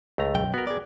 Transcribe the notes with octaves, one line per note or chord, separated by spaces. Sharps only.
C#2 A3 A#5
B1 F#2 G5
B3 F#4 A#4
G#4 D5